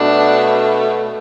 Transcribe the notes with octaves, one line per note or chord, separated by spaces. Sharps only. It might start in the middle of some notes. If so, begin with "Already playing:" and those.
Already playing: B2 A3 D4